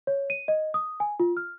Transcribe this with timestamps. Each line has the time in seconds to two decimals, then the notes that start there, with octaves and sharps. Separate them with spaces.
0.07 C#5
0.30 D#7
0.48 D#5
0.74 D#6
1.00 G#5
1.20 F4
1.37 F6